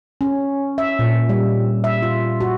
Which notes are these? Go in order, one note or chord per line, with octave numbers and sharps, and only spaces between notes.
C#4
E5
A#2
G3
E5
F4
F#4